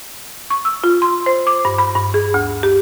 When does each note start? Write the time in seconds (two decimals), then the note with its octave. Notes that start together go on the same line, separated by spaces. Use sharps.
0.50 C#6
0.65 E6
0.84 F4
1.02 C6
1.26 C5
1.47 D6
1.65 G2
1.78 B5
1.96 G2
2.14 G#4
2.34 D2
2.63 G4